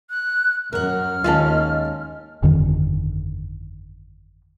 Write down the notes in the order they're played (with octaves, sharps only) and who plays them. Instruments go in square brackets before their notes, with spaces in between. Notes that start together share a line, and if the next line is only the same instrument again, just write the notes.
[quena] F#6
[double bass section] F#2 [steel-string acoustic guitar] A#4 F#5 [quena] F6
[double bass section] D#2 [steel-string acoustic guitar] G#3 C#4 D#4 [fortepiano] F4 A5
[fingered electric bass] G1 F2 D3 D#3